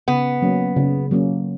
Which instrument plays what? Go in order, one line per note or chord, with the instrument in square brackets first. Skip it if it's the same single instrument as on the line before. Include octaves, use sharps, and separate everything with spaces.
[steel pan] C#3 [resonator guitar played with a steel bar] B3
[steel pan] F#3 A#3 C#4
C#3
F#3 A#3 C#4